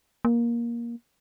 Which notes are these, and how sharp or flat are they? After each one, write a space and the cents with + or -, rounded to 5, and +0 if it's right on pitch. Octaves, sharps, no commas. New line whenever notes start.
A#3 +15